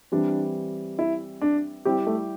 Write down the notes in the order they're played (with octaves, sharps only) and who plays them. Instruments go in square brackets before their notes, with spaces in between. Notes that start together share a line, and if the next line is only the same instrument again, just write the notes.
[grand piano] E3 G3 C4 [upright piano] D4
[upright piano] E4
D4
[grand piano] G3 E4 G4 [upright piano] C4
[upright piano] A3